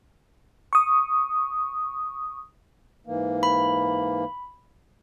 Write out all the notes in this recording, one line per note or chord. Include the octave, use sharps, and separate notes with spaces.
C#6 D#6
G#2 E3 A#3
B5